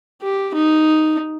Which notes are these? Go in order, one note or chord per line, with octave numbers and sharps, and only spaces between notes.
G4
D#4